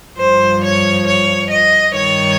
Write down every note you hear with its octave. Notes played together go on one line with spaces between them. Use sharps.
G2 F3 C5
C#5
C#5
D#5
G2 D#3 C#5